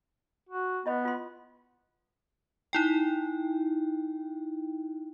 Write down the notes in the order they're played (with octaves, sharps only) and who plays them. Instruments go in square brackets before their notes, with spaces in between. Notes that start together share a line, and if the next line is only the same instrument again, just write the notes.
[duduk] F#4
[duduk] B3 [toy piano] E4 D#5 B5
[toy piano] F4 C6
[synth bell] D#4 E4 G5